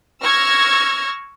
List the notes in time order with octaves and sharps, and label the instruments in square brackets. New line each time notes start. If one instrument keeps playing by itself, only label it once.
[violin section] C#6 E6 F6 G#6 A#6